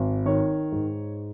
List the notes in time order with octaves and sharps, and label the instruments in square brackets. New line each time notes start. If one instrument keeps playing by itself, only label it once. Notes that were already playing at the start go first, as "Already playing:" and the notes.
Already playing: [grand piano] G#1
D#3 C#5
G#2